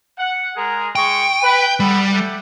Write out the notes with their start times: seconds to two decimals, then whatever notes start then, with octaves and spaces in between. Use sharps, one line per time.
0.18 F#5
0.57 G#3 G#4 A#4
0.96 G#3 G5 C#6
1.43 B4
1.80 G3 B3 A4 B5
2.11 A3 G4 F#5